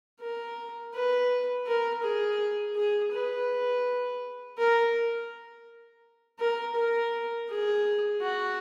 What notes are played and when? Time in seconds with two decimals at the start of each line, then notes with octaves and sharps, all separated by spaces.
0.20 A#4
0.94 B4
1.67 A#4
2.03 G#4
2.76 G#4
3.12 B4
4.58 A#4
6.39 A#4
6.75 A#4
7.49 G#4
8.21 F#4